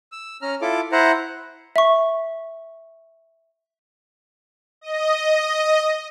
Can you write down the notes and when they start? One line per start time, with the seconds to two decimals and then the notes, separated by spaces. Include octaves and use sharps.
0.12 E6
0.42 C#4 A#5 F6
0.61 E4 F4 A4 D6
0.92 E4 C5 F#5 A#5
1.76 E5 C#6
4.81 D#5